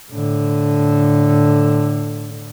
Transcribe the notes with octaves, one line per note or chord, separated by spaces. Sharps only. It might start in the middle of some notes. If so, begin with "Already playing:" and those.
A2 D3